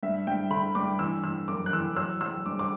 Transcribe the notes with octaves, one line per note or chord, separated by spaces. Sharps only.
G2 E5
G2 G5
D3 B5
G2 D6
E3 E6
E3 E6
F#2 D6
F#6
E3 E6
F#3 E6
F#3 E6
G2 D6
D6